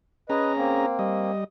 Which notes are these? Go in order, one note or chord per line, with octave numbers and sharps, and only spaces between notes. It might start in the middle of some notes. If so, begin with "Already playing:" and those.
C#4 G#4 B4 D#5 A#5
A#3 C4
G3 D#5